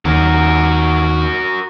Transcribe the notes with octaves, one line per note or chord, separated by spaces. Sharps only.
D#2 F#4 A#4